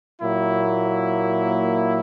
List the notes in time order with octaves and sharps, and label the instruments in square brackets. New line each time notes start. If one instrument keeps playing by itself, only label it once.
[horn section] A#2 F#3 A#3 E4